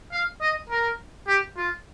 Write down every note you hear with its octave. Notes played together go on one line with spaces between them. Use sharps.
F5
D#5
A#4
G4
F4